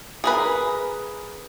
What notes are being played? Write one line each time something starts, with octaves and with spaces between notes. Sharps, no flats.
G#4 A#4 B4